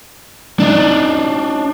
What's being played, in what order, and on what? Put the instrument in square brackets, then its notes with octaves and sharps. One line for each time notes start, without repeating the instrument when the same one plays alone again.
[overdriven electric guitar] D4 D#4